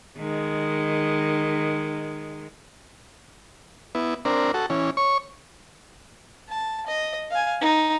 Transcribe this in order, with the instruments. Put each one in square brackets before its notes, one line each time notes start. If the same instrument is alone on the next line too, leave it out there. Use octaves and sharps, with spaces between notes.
[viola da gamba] D#3 G#3
[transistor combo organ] B3 E4
C4 D4 A#4
F#4 A4
E3 C#4
C#5 C#6
[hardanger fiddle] A5
D#5
F5 G#5
D#4